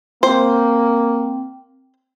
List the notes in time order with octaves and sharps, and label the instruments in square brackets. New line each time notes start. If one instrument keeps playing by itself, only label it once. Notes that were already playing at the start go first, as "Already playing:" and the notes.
[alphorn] A#3 [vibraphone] C4 G5 [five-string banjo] C5